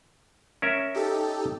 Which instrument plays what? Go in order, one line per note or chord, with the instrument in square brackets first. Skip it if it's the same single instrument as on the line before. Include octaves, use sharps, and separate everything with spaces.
[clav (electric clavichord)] C#4 A#4 E5
[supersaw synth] D#4 G4 A4